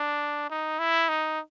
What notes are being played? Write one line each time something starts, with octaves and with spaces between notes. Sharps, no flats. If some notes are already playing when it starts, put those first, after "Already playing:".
Already playing: D4
D#4
E4
D#4